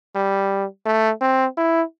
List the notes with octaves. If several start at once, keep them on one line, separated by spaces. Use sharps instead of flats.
G3
A3
C4
E4